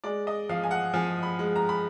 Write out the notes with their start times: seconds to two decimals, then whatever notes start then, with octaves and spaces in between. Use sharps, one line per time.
0.04 G#3 D5
0.27 D#5
0.49 F3 F5
0.64 G#5
0.71 F#5
0.94 F3 G#5
1.23 B5
1.39 G#3
1.56 A#5
1.69 B5